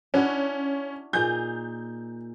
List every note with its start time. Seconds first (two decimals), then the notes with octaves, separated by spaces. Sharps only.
0.14 C#4 D4 E4 F#4
1.13 A#2 D#4 G#4 G6